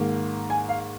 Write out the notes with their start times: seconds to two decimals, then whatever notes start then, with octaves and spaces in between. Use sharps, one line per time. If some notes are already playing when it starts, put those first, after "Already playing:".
Already playing: G#2 D#3 A#3
0.50 G#5
0.69 F5